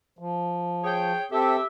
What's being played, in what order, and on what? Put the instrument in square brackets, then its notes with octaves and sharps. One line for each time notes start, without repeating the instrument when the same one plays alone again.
[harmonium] F3
[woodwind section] G#4 C#5 G5
[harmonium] C4 A4 [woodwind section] G4 E5